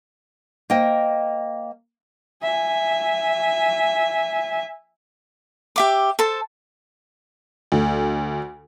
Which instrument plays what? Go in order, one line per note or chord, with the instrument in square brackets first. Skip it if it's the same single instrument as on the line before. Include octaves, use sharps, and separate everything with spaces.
[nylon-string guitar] A#3 C5 D#5 G5
[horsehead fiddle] E5 G#5
[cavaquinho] G4 E5 D6
A4 C5 A5
[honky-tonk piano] D2